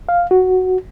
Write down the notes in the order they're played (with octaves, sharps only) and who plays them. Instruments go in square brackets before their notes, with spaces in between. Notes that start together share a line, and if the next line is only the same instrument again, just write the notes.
[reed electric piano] F5
F#4